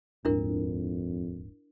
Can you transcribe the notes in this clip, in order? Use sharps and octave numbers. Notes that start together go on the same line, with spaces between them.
D#1 F2 G#2 D4 E4 A#4